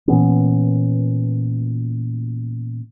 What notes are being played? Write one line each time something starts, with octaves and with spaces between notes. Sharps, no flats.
A#2 E3 B3 C#4